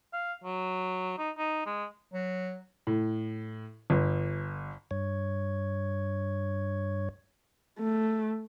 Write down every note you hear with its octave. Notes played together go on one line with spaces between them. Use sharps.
F5
F#3
D#4
D#4
G#3
F#3
A2
G1
G2 C#5
A3